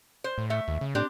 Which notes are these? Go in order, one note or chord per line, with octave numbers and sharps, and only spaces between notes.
C5
A2
A3 E5
D#2
C#3
A2 C4 D4 G4